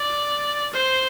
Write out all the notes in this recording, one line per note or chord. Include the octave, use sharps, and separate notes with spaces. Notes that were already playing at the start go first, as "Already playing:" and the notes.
Already playing: D5
C5